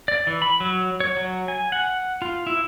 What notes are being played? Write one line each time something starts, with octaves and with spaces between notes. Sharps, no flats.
D5
E3
B5
F#3
C#5
F#3
G#5
F#5
F4
E4